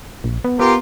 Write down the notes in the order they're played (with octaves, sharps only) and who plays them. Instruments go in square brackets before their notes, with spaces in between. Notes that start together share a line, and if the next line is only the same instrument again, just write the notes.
[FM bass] A#1
B3
[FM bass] B3 [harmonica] F4 G4 A#4